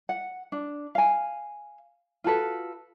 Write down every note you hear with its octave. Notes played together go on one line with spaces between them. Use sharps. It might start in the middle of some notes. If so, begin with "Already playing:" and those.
F#5
D4
F5 G#5
F4 F#4 A4 B4